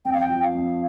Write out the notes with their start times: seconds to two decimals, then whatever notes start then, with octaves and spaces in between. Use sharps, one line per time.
0.05 F2 G5
0.13 F5
0.20 G5
0.30 F3
0.42 F5
0.55 F2